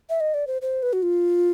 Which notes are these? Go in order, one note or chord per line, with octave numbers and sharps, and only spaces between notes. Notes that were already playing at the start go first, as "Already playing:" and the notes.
E5
D#5
D5
C5
C5
B4
F#4
F4